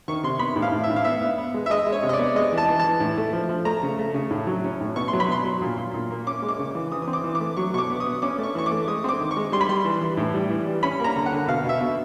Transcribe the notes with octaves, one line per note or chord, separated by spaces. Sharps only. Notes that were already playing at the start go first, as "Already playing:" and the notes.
D#3 C#6
C3 C6
B3 B5
A2
F5
A2
E5
A2
F5
B3 E5
B3
B3
G#3
E5
G#3 D#5
G#3
C#5
C3
D#5
D5
B3
G#3 D#5
E3
A5
E3
E3 A5
A2
A3
F3
F3
A3 A#5
C#3
A3
C#3
A2
F#3
C#4
A2
B2 C#6
C6
F#3
B5
B2 C6
F#3
A#2
A#2
A#2
A#3
C#4 D6
G#3
D6
C#3
E3
E3 D#6
D#6
C4
D6
E3
D6
A3
F#3 C#6
B2 C#6 D6
B3
D#6
B3
C#4 D6
A3 C#6
E3 C#6
D6
A3
G#3 D#6
C4 D6
D#3
C#6
G#3
G3 C6
B5
G3 C6
E3
E3
A2
G3
E3
G3
C#4 B5
A#3 A#5
D3
F#5
D3
B2 F5
B2 E5
B2